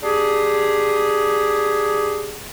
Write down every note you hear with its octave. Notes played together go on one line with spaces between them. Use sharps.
D4 G4 G#4